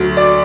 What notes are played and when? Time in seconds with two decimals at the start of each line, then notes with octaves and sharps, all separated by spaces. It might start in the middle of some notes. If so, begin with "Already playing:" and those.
Already playing: D2 D3 F#3 A3
0.17 D5